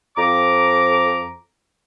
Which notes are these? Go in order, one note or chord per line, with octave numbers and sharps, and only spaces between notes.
F2 A#5 D6